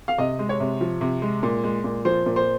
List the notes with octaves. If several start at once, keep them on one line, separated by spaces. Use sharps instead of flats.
F5
C3 D#5
G#3
C#5
C3
F3
C3
G#3
A#2
G#3
A#2
F3 C5
A#2
C5